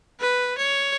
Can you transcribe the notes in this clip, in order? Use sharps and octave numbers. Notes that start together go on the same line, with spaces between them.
B4
C#5